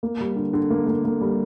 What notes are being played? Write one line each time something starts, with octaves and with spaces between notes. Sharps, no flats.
A#3
G3
D3
D3
A#3
A#3
A#3
G3